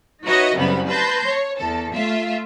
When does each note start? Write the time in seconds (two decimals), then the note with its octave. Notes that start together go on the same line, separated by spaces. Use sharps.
0.24 D#4 F#4 B4 C#5 D#5 E5
0.55 C2 F#2 C#3 G3 B3 B5
0.88 B4 A5 C6 G6 A#6
1.27 C#5
1.59 E2 A4
1.94 A3 F4 E5